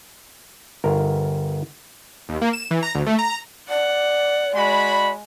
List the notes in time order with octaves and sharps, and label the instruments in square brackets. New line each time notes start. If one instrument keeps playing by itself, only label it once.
[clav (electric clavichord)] G1 A#4
[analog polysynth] D#2
A#3
E7
E3
A#5
D2
A3
A#5
[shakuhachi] D5 [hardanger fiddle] F#5
[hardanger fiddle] G#3 [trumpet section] F#4 B5